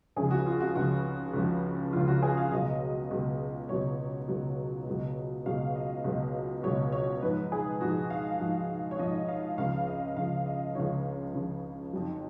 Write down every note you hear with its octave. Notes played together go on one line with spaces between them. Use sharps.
C#2 C#3 F3 G#4
F#4
F4
F#4
C#2 C#3 F3 F#4
C#2 C#3 F3
C#2 C#3 F3 F4
F#4
G#4
F5
C#2 B2 F#3 D#5
C#2 B2 F#3
C#2 B2 F#3 C#5
C#2 B2 F#3
C#2 B2 F#3
C#2 B2 F#3 F5
D#5
C#2 B2 F#3
C#2 B2 F#3 C#5
C#5
G#2 F3 B4
G#4
G#2 F3 F#4
F5
G#2 F3
C#5
G#2 F3 D#5
F5
C#2 C#3 F3 F5
D#5
C#2 C#3 F3 F5
D#5
C#2 C#3 F3 C#5
C#2 C#3 F3
F2 D#3 F#3